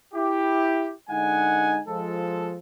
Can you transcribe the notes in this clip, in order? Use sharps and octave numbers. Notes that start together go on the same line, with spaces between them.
E4 G4
D3 G#3 D#4 F#5 G#5
F3 G#3 A4